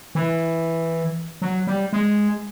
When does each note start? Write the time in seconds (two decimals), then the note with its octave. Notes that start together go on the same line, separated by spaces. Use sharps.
0.15 E3
1.42 F#3
1.67 G3
1.93 G#3